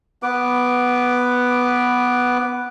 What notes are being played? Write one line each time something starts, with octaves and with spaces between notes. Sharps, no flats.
B3 B4 D6